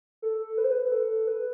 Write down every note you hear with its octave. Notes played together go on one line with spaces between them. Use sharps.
A4
B4
C5
B4
A4
B4